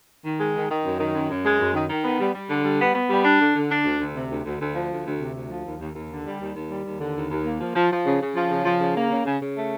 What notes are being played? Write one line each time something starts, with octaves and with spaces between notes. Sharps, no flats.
D#3
G#3
D#3
D#3
F#2
D#3
F#2
F#2
G#3
F#2
D#3
D#3
B3
G3
G3
D3
G3
B3
B3
G3
D4
D3
D3
D4
D2
D2
C3
D2
D2
D2
F3
D2
D2
C3
D2
F3
D#2
D#2
D#2
D3
G3
D#2
D#2
G3
D#2
D3
D#2
D#2
A#3
F3
F3
F3
C#3
C#3
F3
C#3
F3
C#3
A#3
C#3
C#3
C#3
A3